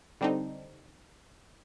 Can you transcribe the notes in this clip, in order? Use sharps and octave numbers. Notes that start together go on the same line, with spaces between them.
D3 G3 C4 D4 D#4